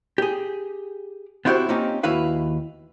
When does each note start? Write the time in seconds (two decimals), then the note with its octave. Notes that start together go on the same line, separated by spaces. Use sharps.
0.18 G4 G#4
1.45 B3 C4 E4 F#4 G4 C5
1.69 A#3 C4 C#4 D#4 F4 G4
2.03 D#2 E4 F#4 B4 F5